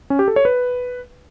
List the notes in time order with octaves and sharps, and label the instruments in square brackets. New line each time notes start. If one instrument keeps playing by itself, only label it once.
[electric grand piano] C#4
G4
A4
C#5
B4